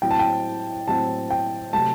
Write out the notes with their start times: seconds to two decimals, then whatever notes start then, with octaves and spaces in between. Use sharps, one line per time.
0.02 A2 F#3 C4 E4 G5
0.11 A5
0.19 G5
0.88 A2 F#3 C4 E4 A5
1.31 G5
1.73 C3 F#3 A3 A5